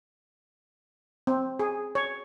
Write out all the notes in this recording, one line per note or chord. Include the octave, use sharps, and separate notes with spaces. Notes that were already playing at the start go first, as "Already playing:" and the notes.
C4
G#4
C#5